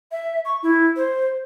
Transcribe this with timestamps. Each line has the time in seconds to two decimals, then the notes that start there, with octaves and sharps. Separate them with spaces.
0.12 E5
0.45 C#6
0.63 E4
0.96 C5